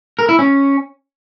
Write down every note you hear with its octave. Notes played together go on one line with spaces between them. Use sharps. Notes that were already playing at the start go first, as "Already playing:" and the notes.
A#4
E4
C#4